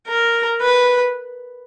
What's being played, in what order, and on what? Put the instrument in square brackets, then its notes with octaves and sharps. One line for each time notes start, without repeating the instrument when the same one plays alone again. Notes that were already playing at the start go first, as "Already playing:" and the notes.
[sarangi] A#4
B4